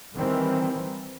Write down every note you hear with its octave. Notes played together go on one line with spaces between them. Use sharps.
D#3 E3 G3 C4